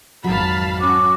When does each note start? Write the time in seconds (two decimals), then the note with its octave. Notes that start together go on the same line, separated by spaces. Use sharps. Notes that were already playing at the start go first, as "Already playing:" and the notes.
0.24 G#1 F2 F#3 F5 A5 B5
0.80 C#4 F#4 D6